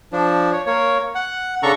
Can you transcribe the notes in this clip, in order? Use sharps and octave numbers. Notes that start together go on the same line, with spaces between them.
F3 D4
C#5
A#3 C#5
F#5
C#3 D4 A4 A#5 C#6